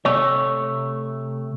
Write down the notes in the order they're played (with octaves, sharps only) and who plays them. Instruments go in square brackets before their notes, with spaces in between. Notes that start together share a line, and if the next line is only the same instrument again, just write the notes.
[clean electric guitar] C3 A3 C#5